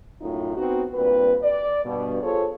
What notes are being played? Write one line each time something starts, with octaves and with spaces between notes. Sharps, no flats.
F#2 A2 D#4 F4
B3 C4 D#4 F#4
G2 A#2 C4 B4
D5
G2 B2
F4 G#4 A4 C5 C#5